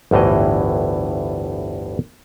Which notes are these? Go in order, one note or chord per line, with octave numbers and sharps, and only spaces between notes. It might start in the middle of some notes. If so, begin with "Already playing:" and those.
G1 D2 A2 E3 D#5